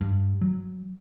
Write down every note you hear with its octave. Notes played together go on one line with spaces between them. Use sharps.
G2
F#3